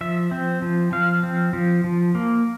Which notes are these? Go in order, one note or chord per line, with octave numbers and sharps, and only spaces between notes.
F3 E5
C4
F3
F3 F5
C4
F3
F3
A#3